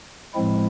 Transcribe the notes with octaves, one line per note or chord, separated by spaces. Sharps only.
A2 F3 G#3 C4 E4